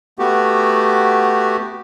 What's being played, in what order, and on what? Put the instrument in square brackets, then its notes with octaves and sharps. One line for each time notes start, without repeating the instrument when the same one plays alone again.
[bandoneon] A3 B3 F#4 G4